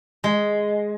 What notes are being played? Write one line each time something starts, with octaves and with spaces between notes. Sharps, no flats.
G#3